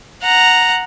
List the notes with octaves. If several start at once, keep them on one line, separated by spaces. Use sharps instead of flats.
F#5 A#5